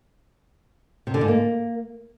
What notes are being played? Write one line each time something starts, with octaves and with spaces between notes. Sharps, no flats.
C3
D3
G#2
A#3